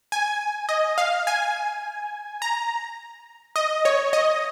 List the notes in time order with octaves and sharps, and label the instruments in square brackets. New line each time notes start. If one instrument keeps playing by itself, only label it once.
[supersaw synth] G#5
D#5
F5
G#5
A#5
D#5
C#5
D#5